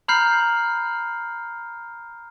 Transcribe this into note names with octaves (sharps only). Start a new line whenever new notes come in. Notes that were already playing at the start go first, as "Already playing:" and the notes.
A#5 B5 F6 G6 C7